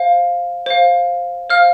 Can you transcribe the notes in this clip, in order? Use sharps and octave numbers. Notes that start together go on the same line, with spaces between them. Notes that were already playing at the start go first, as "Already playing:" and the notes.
Already playing: C5 F5
C5 F5
C5 F5 F6